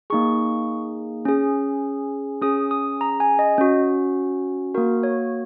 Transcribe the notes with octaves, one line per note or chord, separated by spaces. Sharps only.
A#3 D#4 G#4 C#6
C#4 G#4
C#4 G#4 D#6
D#6
A#5
G#5
D#5
C#4 F#4
A#3 F#4 A#4
C#5